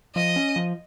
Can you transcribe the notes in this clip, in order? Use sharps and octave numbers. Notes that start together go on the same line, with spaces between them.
F3 D#5
C#4
F3